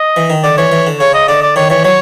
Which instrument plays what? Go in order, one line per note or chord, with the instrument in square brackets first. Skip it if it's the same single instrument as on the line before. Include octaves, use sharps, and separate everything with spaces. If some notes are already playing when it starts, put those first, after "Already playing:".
Already playing: [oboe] D#5
[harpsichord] E3
D#3
[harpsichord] D3 [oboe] D5
[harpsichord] E3 [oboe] C#5
[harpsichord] E3
D3
[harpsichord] C#3 [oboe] C#5
[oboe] D#5
[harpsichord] D3 [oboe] D5
[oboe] D5
[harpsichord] D#3 [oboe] C#5
[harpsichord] E3 [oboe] C#5
[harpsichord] F#3 [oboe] C#5